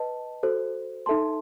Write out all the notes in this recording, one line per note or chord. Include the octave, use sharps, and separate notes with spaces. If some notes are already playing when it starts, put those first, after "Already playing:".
Already playing: B4 D#5 A5
F#4 A4 C5
D#4 A4 E5 A5 C6